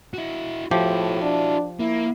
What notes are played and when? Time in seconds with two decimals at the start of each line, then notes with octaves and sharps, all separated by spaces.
0.14 E4 F#4
0.71 A2 F3 E4 F#4 G4
1.22 D4
1.80 A#3 E4